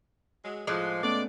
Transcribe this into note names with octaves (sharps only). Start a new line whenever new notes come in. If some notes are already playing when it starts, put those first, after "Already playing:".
F#3 G#3
A2 F3 G#3 D6 F#6
A3 B3 C#4 D5